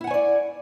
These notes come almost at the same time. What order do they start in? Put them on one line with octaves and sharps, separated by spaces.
E4 F#5 G#5 C#5 D5